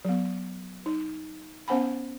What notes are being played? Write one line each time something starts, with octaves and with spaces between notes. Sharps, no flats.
F#3 B3
D#4
B3 C#4 C5 F#5 G#5 B5